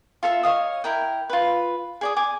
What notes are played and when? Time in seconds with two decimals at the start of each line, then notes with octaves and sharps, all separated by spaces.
0.23 F4 A4 E5
0.43 C#5 D#5 F5 D#6
0.84 E4 A#4 G5
1.30 F4 B4
2.01 G#4 D5 D#6
2.17 G#5 D6